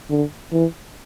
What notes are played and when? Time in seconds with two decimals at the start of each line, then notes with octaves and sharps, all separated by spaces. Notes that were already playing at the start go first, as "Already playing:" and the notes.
0.10 D3
0.52 E3